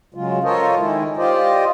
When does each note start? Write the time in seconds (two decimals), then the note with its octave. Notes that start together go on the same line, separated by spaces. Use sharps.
0.15 C#3 F#3 G#3 F4
0.44 F4 A4 A#4 C5 C#5 D#5
0.79 D#3 G#3 E4
1.17 F4 G4 C5 D5 D#5